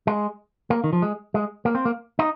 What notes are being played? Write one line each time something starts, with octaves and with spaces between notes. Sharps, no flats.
G#3
A#3
D#3
F3
G#3
G#3
A#3
C4
A#3
D#4